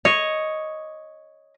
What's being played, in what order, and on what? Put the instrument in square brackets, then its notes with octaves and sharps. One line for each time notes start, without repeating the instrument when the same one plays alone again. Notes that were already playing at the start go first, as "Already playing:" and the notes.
[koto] C#5 [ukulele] D#5